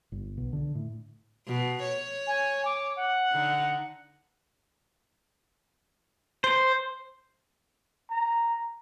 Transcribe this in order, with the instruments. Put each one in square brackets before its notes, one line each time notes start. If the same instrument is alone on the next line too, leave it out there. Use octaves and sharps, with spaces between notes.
[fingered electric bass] G1
B1
D3
A2
[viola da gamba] B2
C#5
[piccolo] G#5
D6
F#5
[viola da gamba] D3 D#4
[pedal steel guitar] C5
[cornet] A#5